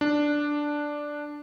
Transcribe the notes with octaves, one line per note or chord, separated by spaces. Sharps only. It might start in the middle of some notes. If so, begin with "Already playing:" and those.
D4